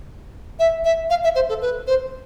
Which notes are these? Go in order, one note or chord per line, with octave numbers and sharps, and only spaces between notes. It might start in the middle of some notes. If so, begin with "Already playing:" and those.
E5
E5
F5
E5
C5
A4
B4
C5